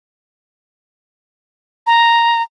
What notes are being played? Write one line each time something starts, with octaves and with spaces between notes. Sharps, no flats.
A#5